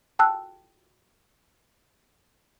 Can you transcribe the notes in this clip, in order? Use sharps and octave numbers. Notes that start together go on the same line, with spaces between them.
G5 A5 E6 F#6